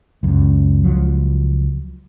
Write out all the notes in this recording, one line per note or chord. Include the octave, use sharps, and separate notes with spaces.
C#2 F#2
C#2 F3 F#3